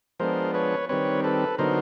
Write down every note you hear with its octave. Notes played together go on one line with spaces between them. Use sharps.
F3 G#3 B3 D4 A#4 C5
B4 C#5
D#3 G3 C4 B4 C#5
A4 B4
D3 F#3 B3 D#4 A#4 C5